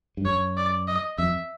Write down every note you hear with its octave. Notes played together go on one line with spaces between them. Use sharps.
G2
F#2 C#5
D5
D#5
F2 E5